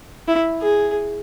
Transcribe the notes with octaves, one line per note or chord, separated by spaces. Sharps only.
E4
G#4